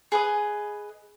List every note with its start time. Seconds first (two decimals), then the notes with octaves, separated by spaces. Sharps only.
0.12 G#4 B4 D#5